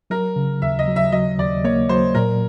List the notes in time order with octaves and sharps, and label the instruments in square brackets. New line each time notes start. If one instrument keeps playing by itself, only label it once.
[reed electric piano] F#3 [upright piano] A#4
[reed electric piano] C#3
[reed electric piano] D#2 [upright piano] E5
[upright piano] D#5
[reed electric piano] F#3
[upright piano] E5
[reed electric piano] F#3 [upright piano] D#5
[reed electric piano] D#2 [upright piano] D5
[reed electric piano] A#3 [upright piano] C#5
[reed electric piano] F#3 [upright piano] C5
[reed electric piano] A#2 [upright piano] A#4